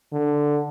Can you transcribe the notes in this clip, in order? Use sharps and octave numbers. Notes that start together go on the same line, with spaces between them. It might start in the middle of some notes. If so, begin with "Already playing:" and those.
D3